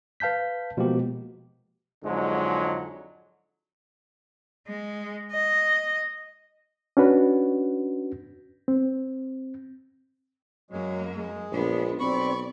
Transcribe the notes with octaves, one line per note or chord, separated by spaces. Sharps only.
B4 F5 A5 G6 B6
B2 F3 G#3 A#3 G4
F2 G#2 D3 F#3 G#3
G#3
D#5
C#4 D4 F#4 B4
C4
F#2 F#3 G#3 A#3
G#3
A#1 B3 D4
B1 C4 D5 B5 C#6